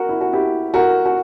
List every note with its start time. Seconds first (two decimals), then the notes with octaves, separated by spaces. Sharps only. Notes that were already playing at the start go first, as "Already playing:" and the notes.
Already playing: F#4 A#4
0.09 E4
0.21 F#4
0.33 E4 G4
0.74 F#4 A#4
1.06 F#4